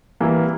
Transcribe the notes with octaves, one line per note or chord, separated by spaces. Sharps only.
E3 G3 A#3 E4